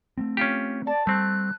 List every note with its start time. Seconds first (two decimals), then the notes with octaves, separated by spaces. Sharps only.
0.18 A3 A#3 C4
0.37 C#4 F4 G4
0.87 D5 A5
1.07 G3 A3 C4 F#6